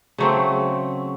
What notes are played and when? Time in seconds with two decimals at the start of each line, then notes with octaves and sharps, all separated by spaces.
0.18 C#3 F#3 A3 C4